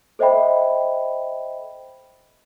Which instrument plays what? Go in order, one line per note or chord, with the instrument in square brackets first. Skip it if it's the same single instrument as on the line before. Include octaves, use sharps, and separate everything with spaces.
[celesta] A4 C5 D#5 E5 G5 B5